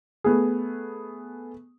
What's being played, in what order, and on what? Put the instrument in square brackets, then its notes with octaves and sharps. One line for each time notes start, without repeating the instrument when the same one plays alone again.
[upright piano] A3 B3 G#4